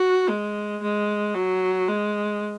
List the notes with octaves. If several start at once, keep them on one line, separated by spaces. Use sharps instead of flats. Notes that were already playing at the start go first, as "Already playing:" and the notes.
Already playing: F#4
G#3
G#3
F#3
G#3